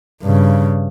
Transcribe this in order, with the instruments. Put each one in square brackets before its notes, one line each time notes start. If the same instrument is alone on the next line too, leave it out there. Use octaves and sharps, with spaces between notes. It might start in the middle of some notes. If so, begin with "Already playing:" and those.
[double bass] G2 C#3